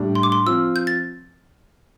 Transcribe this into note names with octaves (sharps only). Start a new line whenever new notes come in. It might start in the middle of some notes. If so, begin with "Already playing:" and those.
Already playing: A2 G3 D4
C6
D6
C6
F3 C4 F4 E6
G6
A6